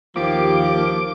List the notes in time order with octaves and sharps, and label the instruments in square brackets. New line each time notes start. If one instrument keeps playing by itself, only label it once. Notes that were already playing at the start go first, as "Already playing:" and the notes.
[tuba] D#2 [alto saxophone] F3 [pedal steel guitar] A#3 G4 [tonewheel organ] D6